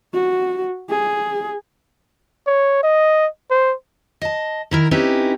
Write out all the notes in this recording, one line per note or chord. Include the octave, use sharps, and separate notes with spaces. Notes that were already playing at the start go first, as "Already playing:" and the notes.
F#4
G#4
C#5
D#5
C5
D#5 A5
D#3 E4 A#4
C4 C#4 D#4 E4 G4 B4